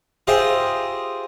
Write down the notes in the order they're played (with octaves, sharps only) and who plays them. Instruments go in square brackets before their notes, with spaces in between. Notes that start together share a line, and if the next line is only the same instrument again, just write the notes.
[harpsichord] F4 G4 G#4 C5 D#5 E5